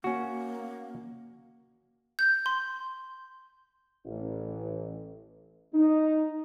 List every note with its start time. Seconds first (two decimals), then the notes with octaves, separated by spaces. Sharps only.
0.04 A#3 C#4 F#4
2.19 G6
2.46 C6
4.05 A1
5.74 D#4